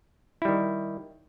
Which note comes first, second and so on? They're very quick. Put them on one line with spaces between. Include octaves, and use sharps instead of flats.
E4 G3 D#3